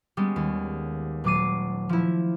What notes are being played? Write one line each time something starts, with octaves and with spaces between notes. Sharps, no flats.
G3 G#3 B3 C#4
D#2
D#1 F#3 A3 D6 C7 D#7
F3 E4